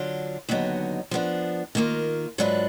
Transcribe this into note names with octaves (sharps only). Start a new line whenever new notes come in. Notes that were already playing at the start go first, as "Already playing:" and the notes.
Already playing: D3 F#3 D4 F4
D#2 D3 F#3 B3 D#4
F3 B3 D4
D#3 A#3 F4
G#2 F#3 D4 F4 B4